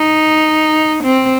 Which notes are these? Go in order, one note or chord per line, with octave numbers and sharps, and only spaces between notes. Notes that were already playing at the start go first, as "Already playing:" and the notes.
Already playing: D#4
C4